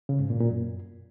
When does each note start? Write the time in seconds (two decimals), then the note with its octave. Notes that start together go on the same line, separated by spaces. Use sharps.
0.09 C#3
0.20 G#2
0.30 A#2
0.41 A#2
0.51 F#2